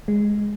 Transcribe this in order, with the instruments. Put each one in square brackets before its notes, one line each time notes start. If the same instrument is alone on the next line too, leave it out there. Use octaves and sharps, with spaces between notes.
[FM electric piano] G#3